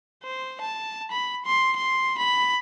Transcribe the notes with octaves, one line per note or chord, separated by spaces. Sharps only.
C5
A5
B5
C6
C6
B5